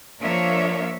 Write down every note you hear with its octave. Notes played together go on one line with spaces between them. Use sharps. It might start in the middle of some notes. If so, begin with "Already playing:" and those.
F3 A#3 D4 C#5 E5